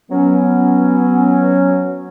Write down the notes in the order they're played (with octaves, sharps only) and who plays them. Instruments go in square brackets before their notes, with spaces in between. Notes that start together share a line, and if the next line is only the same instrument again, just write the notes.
[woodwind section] F#3 C#4 [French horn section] B3